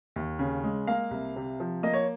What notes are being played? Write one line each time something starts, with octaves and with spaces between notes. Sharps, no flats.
D#2
C#3
G#3
A#3 F5
C2
C3
F3
A#3 D#5
C#5